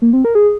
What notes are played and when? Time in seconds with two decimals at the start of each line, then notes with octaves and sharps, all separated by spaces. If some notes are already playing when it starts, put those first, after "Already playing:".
0.02 A#3
0.13 C4
0.25 A#4
0.35 G#4